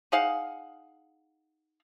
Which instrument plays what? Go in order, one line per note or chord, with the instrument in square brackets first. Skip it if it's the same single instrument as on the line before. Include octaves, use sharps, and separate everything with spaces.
[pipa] D#4 G#4 F5 F#5